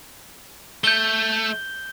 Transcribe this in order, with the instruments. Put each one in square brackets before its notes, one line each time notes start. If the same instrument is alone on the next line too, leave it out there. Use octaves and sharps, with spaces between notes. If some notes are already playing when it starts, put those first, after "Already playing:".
[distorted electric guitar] A3 [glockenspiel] G6 G7